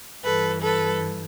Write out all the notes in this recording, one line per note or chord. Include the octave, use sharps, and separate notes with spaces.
G2 E3 A4 B4
A4 B4